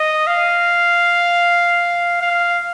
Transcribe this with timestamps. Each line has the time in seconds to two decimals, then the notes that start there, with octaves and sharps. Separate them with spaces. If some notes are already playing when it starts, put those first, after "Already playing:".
Already playing: D#5
0.27 F5
2.21 F5